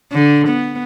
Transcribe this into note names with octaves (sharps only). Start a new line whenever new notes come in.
D3
B3